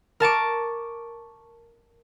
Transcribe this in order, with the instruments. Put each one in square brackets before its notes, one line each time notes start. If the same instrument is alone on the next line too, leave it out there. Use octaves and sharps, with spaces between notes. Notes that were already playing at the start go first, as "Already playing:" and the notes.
[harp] A#4 A5 C#6 D6